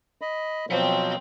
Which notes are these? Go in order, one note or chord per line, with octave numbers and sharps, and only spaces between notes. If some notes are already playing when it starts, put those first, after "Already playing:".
D#5 B5
B2 F3 F#3 C4 G5